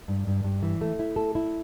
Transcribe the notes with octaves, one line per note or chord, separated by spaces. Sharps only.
G2
G2
G2
E3
A3
E4
A4
E4